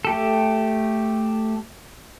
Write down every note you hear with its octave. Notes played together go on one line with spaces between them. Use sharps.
A3 G4 A4